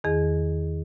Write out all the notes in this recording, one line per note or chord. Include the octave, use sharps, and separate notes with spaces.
E2 D#3 G#4